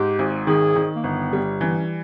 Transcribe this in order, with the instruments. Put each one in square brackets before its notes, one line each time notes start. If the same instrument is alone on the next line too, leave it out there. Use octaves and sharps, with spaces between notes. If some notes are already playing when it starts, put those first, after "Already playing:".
Already playing: [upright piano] G#2 [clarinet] G4
[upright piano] G#1
[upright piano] D#3 [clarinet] G#4
[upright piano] D#3
[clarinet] A#3
[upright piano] G1 [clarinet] B3
[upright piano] G3
[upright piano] E3 [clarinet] C#4
[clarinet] B3
C#4